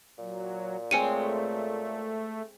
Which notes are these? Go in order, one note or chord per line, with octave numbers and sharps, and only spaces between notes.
A#2 F#3
G#3 A3 C4 C#5 G#5 C#7 D#7